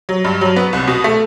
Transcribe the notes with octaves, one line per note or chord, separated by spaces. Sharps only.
F#3
G2
F#3
B3
C2
B2
A3